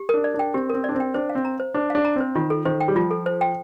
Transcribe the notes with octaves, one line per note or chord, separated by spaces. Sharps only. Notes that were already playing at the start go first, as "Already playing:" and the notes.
Already playing: G4
D4 A#4
D5
D4
G5
C4 G4
C4 A#4
D4 D5
C4
G5
D4 C5
F5
C4
A#5
C5
D4 C5
D4 F5
A#5
C4 C5
D#3 F4
A4
D#3 C5
G5
G3
F3 F4
A4
C5
G5